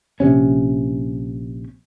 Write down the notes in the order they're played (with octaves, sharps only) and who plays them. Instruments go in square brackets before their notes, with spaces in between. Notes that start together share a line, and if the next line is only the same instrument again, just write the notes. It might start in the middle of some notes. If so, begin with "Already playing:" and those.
[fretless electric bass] A#1 C3 C#4